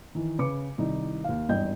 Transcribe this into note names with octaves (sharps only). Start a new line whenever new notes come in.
D#3 E3
C#3 B4 D6 C#7
C2 D#3 D#4 E4
D#2 F5
G#1 E2 G2 D#5 G5 G6